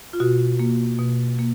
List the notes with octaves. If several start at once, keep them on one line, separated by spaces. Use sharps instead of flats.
F4
B2 F#4
A#3
B2
A#3